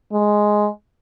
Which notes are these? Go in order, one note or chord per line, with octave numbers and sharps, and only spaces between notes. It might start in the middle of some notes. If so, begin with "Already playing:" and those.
G#3